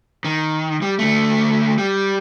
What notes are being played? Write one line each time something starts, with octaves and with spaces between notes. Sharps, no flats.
D#3
G3
D2 A3
G3